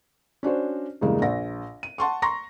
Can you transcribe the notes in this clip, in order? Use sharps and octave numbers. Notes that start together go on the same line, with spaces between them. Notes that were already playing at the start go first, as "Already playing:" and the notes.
C#4 D4 F#4 C5
E2 G2 C#3 G#3 A#3
A#1 A#6
D#7
F#5 A5 C6 C#6
A#5 C6 C#6 A#6